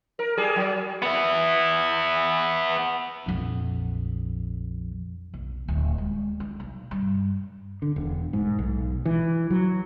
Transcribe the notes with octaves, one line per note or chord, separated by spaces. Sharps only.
A#4
G3 G#4
F#3
B3 E4
A#1 F2
B1
D1
G#3
D4
B1
G2
D3
E1
G#2
B1
E3
F#3